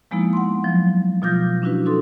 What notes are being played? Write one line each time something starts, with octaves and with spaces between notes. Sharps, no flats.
F3 G#3 A#3 B3 D#4 E4
F#5 C6
F3 F#3
B2 F3 F4 D6 G6 A#6
C#4 D4 E4 F#4 B4
D4 D#4 F#4 A4 C6 D6